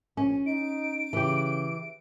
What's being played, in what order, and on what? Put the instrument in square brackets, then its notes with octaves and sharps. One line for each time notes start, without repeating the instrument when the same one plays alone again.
[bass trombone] A#1 [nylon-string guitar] C#4
[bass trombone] D#4 [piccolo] D7
[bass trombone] C#3 [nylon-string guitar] E3 G4